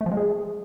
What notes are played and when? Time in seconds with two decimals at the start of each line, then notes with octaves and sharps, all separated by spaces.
0.01 A3
0.06 F3
0.12 G#3
0.17 G#4